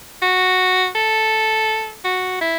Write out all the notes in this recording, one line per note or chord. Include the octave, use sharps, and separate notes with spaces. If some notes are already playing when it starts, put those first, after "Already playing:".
F#4
A4
F#4
E4